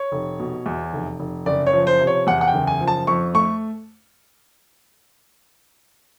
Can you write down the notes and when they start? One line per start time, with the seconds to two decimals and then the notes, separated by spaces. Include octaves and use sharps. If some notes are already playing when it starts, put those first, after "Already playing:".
Already playing: C#5
0.12 F1
0.39 B2
0.66 E2
0.93 F1
1.19 F1
1.46 F#1 D5
1.67 C#5
1.73 F3
1.87 C5
2.00 C3
2.07 C#5
2.27 E2 F#5
2.41 F#5
2.47 G5
2.54 F#1
2.67 G#5
2.81 F3
2.88 A5
3.07 F2 C#6
3.34 A3 C#6